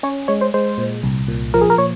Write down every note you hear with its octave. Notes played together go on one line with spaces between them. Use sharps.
C#4 C#5
G#3 C#5
C5
G#3 C5
A#2
C2
A#2
F3 A#4
G#4
A#4
A#2 C#5